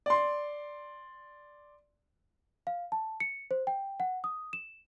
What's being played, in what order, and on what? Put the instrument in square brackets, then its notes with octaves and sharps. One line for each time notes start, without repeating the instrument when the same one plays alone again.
[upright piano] D5 C6
[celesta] F5
A5
C#7
C5
G5
F#5
D#6
E7